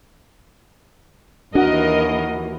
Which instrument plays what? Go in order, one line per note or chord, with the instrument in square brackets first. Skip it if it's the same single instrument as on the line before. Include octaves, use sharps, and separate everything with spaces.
[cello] D#2 E3 [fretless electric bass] D4 [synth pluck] F#4 F#5 [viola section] A#4 D#5